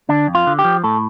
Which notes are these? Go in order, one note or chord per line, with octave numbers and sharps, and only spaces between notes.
D3 D4
F2
F4
D3
G4
F3
A2 A4